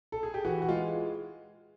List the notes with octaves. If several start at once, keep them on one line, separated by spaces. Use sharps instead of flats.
A4
G#4
G4
E3 F#4
F#4
G#3 F4